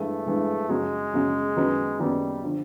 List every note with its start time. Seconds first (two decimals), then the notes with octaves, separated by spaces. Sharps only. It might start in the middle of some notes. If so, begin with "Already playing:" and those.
Already playing: G2 E3 G#3 A3
0.26 G2 E3 G#3
0.69 F#2 C#3 F#3 G#3
1.13 F#2 C#3 F#3
1.57 F#2 D#3 F#3 B3 D#4
1.99 F#2 D#3 F#3 G3 B3 D#4
2.43 D3 F3